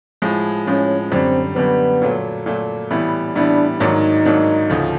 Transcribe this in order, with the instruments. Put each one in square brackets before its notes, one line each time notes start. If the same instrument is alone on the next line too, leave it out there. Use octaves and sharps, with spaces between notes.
[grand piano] A2 F3 G#3
[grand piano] A2 F3 G#3 [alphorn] C#4
[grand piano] F#2 D3 G3 [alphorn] C4
[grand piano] F#2 D3 G3 [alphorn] B3
[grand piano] A#2 F#3 A3
A#2 F#3 A3
A2 E3 G3 B3 E4
[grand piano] A2 E3 G3 B3 E4 [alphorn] D4
[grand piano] G#2 D#3 F#3 A#3 D4 [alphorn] D#4
[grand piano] G#2 D#3 F#3 A#3 D4
D2 C#3 F3 A3